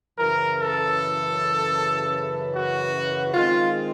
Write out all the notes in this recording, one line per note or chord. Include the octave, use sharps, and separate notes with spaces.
F#2 C#3 E3 A#4
A4
F#4
D#3 G#3 C4 F4